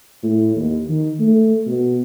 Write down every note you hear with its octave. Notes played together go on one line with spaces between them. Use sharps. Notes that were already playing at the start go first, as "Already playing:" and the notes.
A2
D#2
D#3
A3
B2